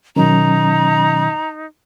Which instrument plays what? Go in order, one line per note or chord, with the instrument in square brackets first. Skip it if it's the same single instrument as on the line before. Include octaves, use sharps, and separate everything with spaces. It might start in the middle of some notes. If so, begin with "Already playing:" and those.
[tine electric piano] B2 D#3 [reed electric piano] F#3 C#4 [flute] D#4 [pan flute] A#5